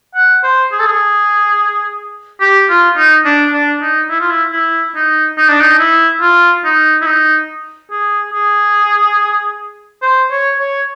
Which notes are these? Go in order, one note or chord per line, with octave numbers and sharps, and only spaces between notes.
F#5
C5
G#4
A4
G#4
G4
F4
D#4
D4
D4
D#4
E4
F4
E4
E4
D#4
D#4
D4
D#4
E4
F4
D#4
E4
D#4
G#4
G#4
C5
C#5
C#5